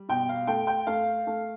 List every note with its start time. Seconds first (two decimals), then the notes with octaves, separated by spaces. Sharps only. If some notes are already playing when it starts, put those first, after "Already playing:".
Already playing: G3
0.09 B2 G5
0.29 F5
0.47 A3 G5
0.67 G5
0.87 A3 F5
1.27 A3